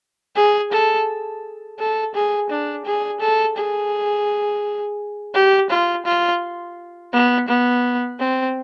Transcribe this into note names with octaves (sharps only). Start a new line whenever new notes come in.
G#4
A4
A4
G#4
D4
G#4
A4
G#4
G4
F4
F4
B3
B3
C4